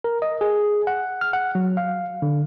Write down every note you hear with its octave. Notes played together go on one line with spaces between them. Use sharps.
A#4
D#5
G#4
F#5
F6
F#5
F#3
F5
D3